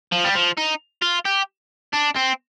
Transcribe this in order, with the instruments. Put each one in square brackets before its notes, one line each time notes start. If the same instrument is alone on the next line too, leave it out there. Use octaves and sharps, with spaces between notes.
[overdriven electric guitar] F3
G3
F3
D#4
F4
G4
D4
C4